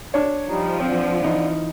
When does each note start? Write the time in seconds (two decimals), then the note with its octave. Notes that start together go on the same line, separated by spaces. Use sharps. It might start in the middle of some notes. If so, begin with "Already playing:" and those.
0.14 D4 C#5
0.47 F3 G3 D#4
0.80 D3 C4
1.22 E3 D#4